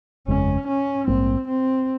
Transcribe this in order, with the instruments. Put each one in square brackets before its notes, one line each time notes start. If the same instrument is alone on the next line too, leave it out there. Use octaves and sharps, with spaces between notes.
[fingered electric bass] G1 F2 C#3 G#3 [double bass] C#4
[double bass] C#4
[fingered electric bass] A#1 G#2 G3 A#3 [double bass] C4
[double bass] C4